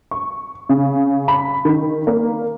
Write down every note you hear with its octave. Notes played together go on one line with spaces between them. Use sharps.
C#6
C#3
B5
D#3
A#3